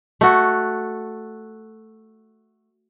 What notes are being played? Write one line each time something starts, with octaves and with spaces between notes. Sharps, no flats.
A3 F#4